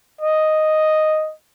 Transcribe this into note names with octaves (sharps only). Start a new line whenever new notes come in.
D#5